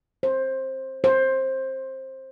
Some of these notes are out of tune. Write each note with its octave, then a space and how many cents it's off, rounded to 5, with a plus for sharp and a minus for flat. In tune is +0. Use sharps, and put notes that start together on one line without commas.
C5 +15
C5 +15